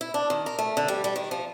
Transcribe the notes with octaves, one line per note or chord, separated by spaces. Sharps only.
E4
D4
D#3
A#4
A3
D3
G3
G3
D#3
F3